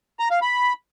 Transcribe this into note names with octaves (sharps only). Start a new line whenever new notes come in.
A#5
F5
B5